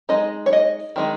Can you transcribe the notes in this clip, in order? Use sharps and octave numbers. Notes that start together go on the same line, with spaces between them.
G#3 D#4 D#5
C#5
D#5
D#3 G#3 D#4